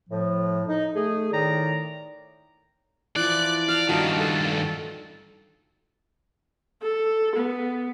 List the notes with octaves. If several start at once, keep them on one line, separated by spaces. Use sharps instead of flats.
A2 F3
D#4
A3 G#4
A2 D#3 D#4 D5 A#5
E3 F3 D5 F#6
F5 A5 A#5 F6
G2 D#3 D#4 F4 F#4 A5
A4
A4
B3